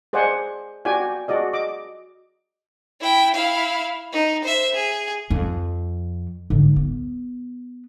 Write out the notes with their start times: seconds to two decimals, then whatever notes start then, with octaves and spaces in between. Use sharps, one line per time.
0.13 G#4 C5 D5 D#5 F#5 G#5
0.85 F#4 G4 D5 G5 G#5
1.28 F#4 G#4 D5 D#5
1.53 D#5 D6
3.01 E4 G5
3.35 E4 F5
4.12 D#4
4.44 C5 E5
4.74 G#4
5.30 F2 F3
6.50 G#2 D3
6.76 B3